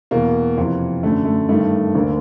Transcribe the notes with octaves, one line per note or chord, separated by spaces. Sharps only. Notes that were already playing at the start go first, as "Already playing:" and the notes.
E2 B2 A#3
F2 C3 E3
F#2 D3 A3
A3
G2 D#3 A3
D2 D3 A#3